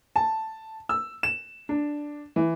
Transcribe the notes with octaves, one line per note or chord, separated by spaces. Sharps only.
A5
E6
E7
D4
E3